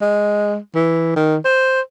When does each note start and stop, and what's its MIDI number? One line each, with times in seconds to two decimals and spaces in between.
0.01 0.57 56
0.75 1.13 52
1.16 1.36 51
1.45 1.81 72